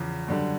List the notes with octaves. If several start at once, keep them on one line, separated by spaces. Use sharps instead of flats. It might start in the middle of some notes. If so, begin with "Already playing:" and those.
Already playing: E2 C#3 F3
F#2 D3 G3